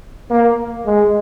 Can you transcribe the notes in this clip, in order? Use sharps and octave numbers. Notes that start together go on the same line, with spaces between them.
A#3
G#3